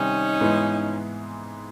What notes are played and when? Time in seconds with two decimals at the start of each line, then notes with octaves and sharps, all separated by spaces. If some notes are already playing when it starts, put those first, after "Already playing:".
Already playing: C3 D#3 G3 C4 C#4 D#4
0.40 G#2 E3 G#3 B3